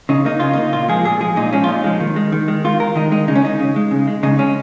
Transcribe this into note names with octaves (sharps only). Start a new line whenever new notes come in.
C#3 D#4
A#3 D#4
C#3 F4
A#3 D#4
A#2 F4
F3 G#3 G#4
A#2 G#4
F3 G#3 G#4
A#2 D#4
F3 G#3 C#4
F4
A#2 D#4
F3 G#3
D#3
G#3
D#3
G#3
D#3 F4
G#3 A#4
D#3 D#4
G#3 D#4
C#3 D#4
C#4
G#3 D#4
C#3
G#3
C#3
G#3
C#3 D#4
G#3 C#4